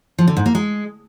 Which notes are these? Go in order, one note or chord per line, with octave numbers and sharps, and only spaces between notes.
F3
D3
G#2
A#3
G#3